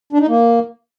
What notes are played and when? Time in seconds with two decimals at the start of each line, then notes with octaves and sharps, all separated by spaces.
0.13 D4
0.21 D#4
0.28 A#3